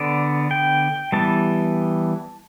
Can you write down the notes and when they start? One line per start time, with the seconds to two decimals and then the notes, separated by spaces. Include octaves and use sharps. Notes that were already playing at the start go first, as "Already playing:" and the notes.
Already playing: D3 B3 D5
0.51 G5
1.12 E3 G3 B3 A5